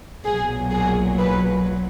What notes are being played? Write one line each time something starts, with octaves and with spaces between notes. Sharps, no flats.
B1 A#2 F#3 G#4
G#4
B4